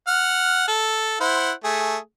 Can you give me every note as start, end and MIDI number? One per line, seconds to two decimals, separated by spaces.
0.07 0.67 78
0.07 0.67 89
0.68 1.17 69
1.20 1.51 64
1.20 1.51 72
1.20 1.51 78
1.64 1.97 57
1.64 1.97 68